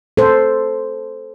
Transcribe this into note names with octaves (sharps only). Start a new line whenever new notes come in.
A4 C5